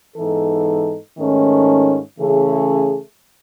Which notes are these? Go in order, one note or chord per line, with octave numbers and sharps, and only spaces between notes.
G#2 E3 B3 D#4 A4
G#2 D#3 A3 C#4
C#3 E3 A3 C#4 G#4